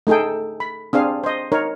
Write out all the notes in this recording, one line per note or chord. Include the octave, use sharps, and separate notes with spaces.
A3 D#4 G#4 A4 G5
B5
C4 D4 G#4 F5
C5 D#5
D#4 A#4 C#5